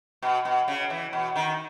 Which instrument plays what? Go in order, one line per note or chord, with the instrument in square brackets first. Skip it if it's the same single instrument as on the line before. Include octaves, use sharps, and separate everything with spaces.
[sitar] B2
B2
C#3
E3
B2
D#3